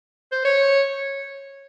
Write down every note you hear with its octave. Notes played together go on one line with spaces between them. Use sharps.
C5
C#5